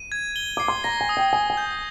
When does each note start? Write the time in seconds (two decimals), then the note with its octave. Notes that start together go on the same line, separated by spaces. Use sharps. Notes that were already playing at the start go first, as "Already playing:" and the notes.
Already playing: D#7
0.12 G#6
0.36 G7
0.57 D6 C7
0.68 C6
0.84 A#5 A#6
1.01 G#5
1.09 D#6
1.17 G5
1.33 G#5 D#6
1.50 G#5
1.57 G6